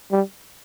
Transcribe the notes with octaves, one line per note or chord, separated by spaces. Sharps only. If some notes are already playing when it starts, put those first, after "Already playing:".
G3